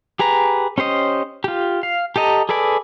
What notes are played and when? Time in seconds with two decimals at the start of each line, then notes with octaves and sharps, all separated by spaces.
0.19 G4 G#4 B4 A#5
0.78 C#4 G4 C5 D#5
1.44 F4 G4
1.83 F5
2.16 G4 A4 D#5 A#5
2.49 G#4 A4 B4 D5 G#5